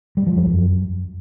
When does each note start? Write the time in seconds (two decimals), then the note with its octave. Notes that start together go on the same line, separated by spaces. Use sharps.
0.17 G3
0.27 F3
0.36 F2
0.46 F#2